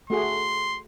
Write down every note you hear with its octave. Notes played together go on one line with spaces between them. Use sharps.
A3 F#4 G#4 C6